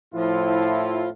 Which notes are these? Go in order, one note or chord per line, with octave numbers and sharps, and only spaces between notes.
A2 F3 E4 F4